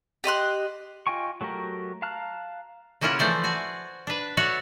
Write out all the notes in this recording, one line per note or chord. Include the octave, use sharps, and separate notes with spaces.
G4 D#5 C6 F#6
F4 D#5 G5 G#5 C#6
F#3 A3 F#4 G4 A#4
F5 A5 A#5 F6 F#6
C#3 A#3 C#4 E4 F4 F#5
E3 F3 A3 C5 D5
F#4 D5 G#5
D4 B4
F#4 A4 C#5 D5 E5 F#5